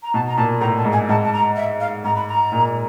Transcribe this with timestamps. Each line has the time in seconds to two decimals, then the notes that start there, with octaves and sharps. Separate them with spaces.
0.03 A#5
0.14 B2 A5
0.28 A#5
0.37 A#2 A5
0.61 A2 A#5
0.77 A5
0.85 G#2
0.93 G#5
1.09 G#2 A5
1.25 A5
1.33 A#5
1.56 E5
1.80 F5
2.04 G#2 A#5
2.16 B5
2.29 A#5
2.52 A#2